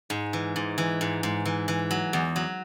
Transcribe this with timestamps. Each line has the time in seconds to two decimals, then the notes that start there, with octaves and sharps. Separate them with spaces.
0.10 G#2
0.33 E3
0.56 G#2
0.78 E3
1.01 G#2
1.23 G#2
1.45 E3
1.68 E3
1.91 F#3
2.13 E2
2.36 F#3